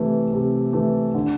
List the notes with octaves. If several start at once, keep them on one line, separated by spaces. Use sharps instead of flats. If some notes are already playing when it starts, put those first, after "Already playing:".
Already playing: C3 E3 A3
C3
E3 A3
D3